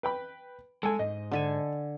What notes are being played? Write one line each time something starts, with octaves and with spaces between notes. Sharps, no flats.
B4 G5 B5
G#3 A4 G#5
G#2 D#5
D3 A4 G#5